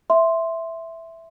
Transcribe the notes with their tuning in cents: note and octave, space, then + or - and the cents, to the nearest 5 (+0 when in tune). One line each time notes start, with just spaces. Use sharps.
E5 +0 C6 +0